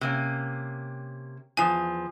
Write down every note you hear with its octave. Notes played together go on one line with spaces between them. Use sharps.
C3 A#3 C#4
E2 F3 G#5